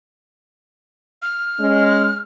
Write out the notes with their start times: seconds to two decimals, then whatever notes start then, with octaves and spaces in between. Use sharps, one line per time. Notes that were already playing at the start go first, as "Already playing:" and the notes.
1.22 F6
1.60 G#3 C#4